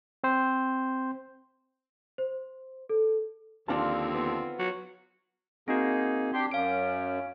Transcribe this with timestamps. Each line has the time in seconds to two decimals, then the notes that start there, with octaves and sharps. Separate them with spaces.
0.24 C4 C5
2.18 C5
2.89 A4
3.68 D#2 D3 F3 C4 D4 F4 A5
4.15 B3
4.59 F#3
5.68 A#3 C4 D#4 F#4 G#4
6.34 D4 G4 C6
6.51 F#2 C#4 F5 D7